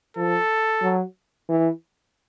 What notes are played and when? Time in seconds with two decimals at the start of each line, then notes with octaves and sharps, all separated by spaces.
0.17 F3 A4
0.82 F#3
1.49 E3